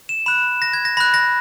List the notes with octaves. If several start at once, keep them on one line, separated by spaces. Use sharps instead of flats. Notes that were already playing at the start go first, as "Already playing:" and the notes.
E7
B5 F#6 E7
A#6
G#6
A#6
B5 F#6 A#6
A#6